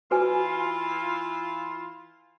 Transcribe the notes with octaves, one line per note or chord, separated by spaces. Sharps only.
E3 F4 F#4 B4 G#5